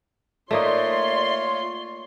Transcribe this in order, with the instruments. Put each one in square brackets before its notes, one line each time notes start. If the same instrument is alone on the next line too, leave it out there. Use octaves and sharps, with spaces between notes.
[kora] A3 A#3 D#4 [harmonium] F4 C#5 [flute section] D5 E5 [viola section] C6